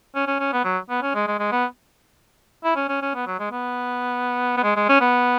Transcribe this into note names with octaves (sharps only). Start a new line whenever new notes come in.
C#4
C#4
C#4
B3
F#3
B3
C#4
G#3
G#3
G#3
B3
E4
C#4
C#4
C#4
B3
F#3
G#3
B3
B3
G#3
G#3
C#4
B3